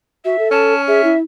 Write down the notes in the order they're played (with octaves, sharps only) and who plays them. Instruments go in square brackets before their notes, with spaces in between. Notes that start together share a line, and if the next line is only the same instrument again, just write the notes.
[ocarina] F#4 [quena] E5
[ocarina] A4
[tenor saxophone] C#4 [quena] A5
[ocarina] G#4 [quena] E5
[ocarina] E4